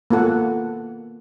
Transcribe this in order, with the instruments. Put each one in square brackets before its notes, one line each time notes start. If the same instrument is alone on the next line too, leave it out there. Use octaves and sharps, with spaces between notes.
[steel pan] A#3 B3 F4 A4 F#5